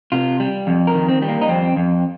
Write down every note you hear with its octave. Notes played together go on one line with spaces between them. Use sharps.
C3 F4
G3
F2
A#4
D#3
C4
G3
A#3
D#4
F2 C4
F2